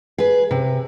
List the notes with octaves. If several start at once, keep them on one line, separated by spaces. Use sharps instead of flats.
G#4 B4
C3